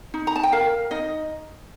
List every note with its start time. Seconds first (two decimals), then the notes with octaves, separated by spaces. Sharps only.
0.14 D#4
0.27 A#5
0.36 A5
0.43 G5
0.52 A#4 F5
0.91 D#4 D#5